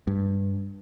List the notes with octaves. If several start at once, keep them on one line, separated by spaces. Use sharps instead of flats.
G2